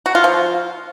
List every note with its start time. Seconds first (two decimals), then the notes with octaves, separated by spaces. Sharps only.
0.06 F#4
0.15 F4
0.24 F3